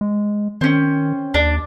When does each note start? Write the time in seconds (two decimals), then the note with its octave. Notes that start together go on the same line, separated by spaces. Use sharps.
0.01 G#3
0.61 D#3 C4 C#4
1.34 D#2 D4